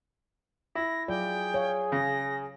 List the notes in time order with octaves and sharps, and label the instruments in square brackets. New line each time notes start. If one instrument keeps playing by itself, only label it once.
[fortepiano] E4 [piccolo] A#6
[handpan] F#3 F4 D5 [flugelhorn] G#4 [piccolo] G5
[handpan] C#5 F5
[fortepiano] C#3 [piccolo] A#6